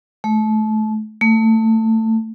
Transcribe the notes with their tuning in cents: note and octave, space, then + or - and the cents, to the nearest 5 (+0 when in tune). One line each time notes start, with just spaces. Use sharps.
A3 -25
A3 +20